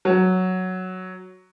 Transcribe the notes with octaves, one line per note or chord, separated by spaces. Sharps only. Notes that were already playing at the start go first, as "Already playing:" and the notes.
F#3